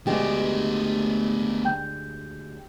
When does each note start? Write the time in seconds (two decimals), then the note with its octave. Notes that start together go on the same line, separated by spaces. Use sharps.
0.07 D2 G#3 A3 B3 G4
1.65 G5 G6